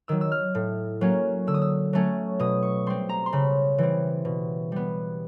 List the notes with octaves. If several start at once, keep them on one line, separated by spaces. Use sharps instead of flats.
D#3 F#3 E6
E6
F6
A2
F#3 A#3 C#4
D3 E6
D#6
E6
F#3 A3 C#4
B2 D#6
C#6
G3 C4 C6
A#5
C6
C#3 B5
E3 G3 C4
B2
G3 B3